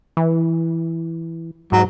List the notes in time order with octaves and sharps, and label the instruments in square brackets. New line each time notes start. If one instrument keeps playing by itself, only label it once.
[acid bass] E3
[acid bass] G#2 [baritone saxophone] F#3